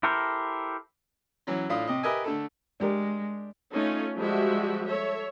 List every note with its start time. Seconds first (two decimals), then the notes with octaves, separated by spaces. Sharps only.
0.03 E4 G4 A4 A#4 C5
1.47 E3 F#3 C#4
1.69 A2 D4 F4 D#6
1.87 C3 D#5
2.03 G4 A#4 B4 D#5 E5 G#5
2.24 D3 A3 A4
2.80 G#3 D4 G4 A#4
3.73 A3 C#4 D#4 F4
4.18 F3 G3 G#3 F#4 G4 E5
4.86 A4 C#5 E5